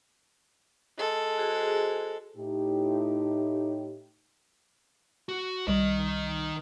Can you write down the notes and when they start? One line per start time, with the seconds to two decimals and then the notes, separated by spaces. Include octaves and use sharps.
0.98 G#3 A4
1.38 F#4 G#4 C5
2.36 A2 D#4 G4
5.29 F#4
5.67 C2 D#3 G3 D#5